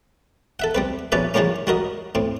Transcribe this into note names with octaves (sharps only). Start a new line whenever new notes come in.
A4 E5 F#5
G3 C4 B4
A#1 F3 C#4 B4 D5 E5
C#3 E3 F3 G3 A#3 C#4
G3 F#4 A#4 D#5
A2 C4